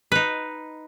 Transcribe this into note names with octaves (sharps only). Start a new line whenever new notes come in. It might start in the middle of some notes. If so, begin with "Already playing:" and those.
D#4 B4